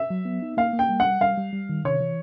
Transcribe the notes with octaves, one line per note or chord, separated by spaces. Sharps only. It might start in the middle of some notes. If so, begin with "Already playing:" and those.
Already playing: E5
F#3
B3
D#4
A#3 F5
A#3
G5
G3
F#5
G3
G3 F5
G3
G3
D#3
C3 C#5
E3